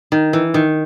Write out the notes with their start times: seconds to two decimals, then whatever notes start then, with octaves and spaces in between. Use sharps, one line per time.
0.12 D#3
0.33 E3
0.54 D#3